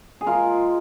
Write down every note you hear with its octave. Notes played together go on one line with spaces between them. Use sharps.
G#4
G#3 F4 A#4